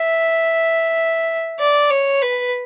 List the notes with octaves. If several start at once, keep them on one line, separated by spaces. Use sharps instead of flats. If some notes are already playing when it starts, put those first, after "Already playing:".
Already playing: E5
D5
C#5
B4